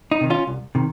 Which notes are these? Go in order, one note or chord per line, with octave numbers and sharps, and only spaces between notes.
D#4
C3 D#3
C#4 F4
C2
C3 D#3